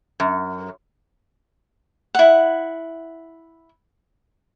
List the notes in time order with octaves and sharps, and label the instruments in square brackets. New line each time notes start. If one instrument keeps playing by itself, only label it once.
[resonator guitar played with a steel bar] F#2
[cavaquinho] E4 F#5